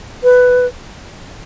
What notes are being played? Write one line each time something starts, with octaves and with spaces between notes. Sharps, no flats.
B4